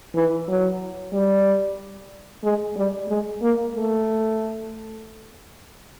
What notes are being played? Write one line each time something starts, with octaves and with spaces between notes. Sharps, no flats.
E3
F#3
G3
G#3
G3
G#3
A#3
A3